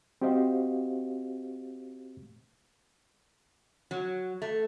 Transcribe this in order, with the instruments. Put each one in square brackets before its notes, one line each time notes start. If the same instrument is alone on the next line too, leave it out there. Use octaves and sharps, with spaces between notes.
[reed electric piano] C4 F#4 G4 C5 D#5 F5
[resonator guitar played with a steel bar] F#3
A3